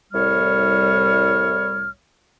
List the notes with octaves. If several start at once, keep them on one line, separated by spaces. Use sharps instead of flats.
C2 A2 G3 C#5 F6